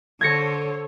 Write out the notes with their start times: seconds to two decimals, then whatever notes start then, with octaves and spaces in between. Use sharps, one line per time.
0.21 D3 A4 C5 C#5 G#6 A#6 C#7